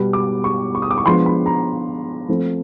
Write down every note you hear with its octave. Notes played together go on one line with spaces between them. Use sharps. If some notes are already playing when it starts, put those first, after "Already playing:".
Already playing: B2 G3 B3
D6
C#6
C#6
D#6
D6
C#6
F3 G#3 B3 D4 C6
B5
A#5
F3 A3 C4